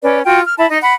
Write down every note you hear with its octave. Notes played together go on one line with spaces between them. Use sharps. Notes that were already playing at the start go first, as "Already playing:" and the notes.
C#4 B4 D5
F4 F#4 G5
F6
E4 E5 A5 B5
D#4 D#5
F#5 B5